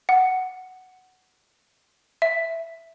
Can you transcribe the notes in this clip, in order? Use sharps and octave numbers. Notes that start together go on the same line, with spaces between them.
F#5
E5